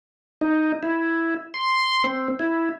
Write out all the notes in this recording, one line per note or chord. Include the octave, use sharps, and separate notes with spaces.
D#4
E4
C6
C4
E4